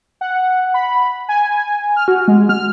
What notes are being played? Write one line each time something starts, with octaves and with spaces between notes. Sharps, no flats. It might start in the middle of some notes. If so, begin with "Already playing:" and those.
F#5
B5
G#5
F6
F#4
G#3
F6